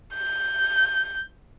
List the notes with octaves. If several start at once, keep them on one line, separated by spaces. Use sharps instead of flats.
G6